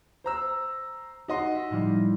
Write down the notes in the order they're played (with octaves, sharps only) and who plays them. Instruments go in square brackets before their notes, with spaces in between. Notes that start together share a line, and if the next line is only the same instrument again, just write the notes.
[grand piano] C5 A#5 E6
[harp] D#4 [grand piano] F#4 D#5 C6
[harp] E5
A2 F3 G3